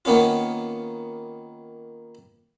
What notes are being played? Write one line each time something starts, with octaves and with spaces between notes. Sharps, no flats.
D#3 A#3 B3 C#4 F4